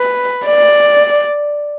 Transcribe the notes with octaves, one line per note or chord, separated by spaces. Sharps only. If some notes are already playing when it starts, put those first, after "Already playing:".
Already playing: B4
D5